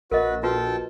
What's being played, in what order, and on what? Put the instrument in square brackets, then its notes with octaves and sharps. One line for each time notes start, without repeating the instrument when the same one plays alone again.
[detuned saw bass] A#1 [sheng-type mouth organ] F#4 B4 [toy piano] A#4 D#5
[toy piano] F4 F#4 B4 [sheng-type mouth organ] A4 G5 A5